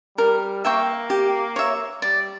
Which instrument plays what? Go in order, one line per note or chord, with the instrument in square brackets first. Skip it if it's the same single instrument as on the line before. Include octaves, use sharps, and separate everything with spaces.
[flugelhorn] G3 [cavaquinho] A#4
[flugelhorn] A#3 [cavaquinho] E5 G5 C#6
[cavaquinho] G4
C#5 E5
[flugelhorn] G3 [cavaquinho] D5